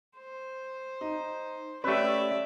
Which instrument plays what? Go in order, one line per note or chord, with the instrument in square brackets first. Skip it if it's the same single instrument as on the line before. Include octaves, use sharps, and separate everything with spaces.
[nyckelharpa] C5
[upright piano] D#4
[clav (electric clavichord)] A3 B4 [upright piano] C#4 G4 [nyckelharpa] D5 E5